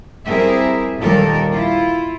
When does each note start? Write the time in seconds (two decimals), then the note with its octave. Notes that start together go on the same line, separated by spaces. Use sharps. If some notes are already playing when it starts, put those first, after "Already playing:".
0.26 G3 C4 E4 G#4 A#4 E5
1.00 D#2 A#2 D#3 G3 A4 A#4
1.52 E4 F4